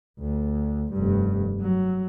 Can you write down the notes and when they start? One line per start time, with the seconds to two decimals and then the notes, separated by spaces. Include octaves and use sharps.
0.19 D2
0.93 F1 G2
1.61 F#3